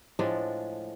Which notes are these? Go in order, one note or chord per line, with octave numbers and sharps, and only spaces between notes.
A2 F3 G#3 D4